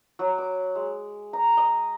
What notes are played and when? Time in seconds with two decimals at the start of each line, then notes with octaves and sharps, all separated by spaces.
0.19 F#3
0.38 D6
0.75 G#3
1.33 A#5
1.57 D#5